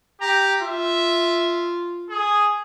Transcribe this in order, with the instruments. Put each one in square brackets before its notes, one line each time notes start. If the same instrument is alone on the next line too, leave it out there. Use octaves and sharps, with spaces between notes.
[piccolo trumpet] G4 [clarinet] A#5
[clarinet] F4 [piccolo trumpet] E5
[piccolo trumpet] G#4